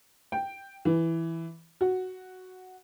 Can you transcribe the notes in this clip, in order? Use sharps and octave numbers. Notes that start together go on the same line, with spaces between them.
G5
E3
F#4